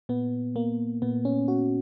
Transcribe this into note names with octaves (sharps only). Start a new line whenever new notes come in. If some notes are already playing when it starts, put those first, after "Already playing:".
A#2 B3
A#3
A#2 B3
C#4
F#4